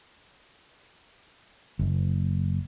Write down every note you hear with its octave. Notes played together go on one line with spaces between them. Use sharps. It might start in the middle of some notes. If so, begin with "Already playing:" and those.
F#1